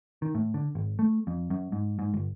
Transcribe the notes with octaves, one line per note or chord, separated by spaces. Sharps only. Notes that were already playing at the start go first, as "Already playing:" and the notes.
D#3
A2
D3
G#1
A3
F2
F#2
G#2
G#2
G1